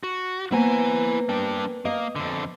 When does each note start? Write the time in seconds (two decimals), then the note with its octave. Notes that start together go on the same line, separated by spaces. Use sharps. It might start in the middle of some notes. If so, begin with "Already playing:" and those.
0.04 F#4
0.52 A#3 B3 E4 C5 G#5
1.29 G3 D4
1.85 A#3 D#5
2.16 F2 D3